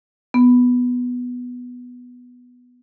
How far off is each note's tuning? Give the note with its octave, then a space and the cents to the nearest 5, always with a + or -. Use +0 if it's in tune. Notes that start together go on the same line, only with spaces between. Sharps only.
B3 +0